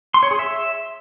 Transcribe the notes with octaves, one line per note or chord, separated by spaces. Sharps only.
C6
C#5
G#4
E5